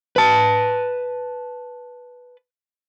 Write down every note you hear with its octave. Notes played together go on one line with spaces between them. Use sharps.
B4 A5